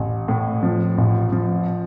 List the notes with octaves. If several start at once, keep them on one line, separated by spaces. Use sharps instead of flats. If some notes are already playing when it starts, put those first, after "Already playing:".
Already playing: A1
A2
F3
A1
F3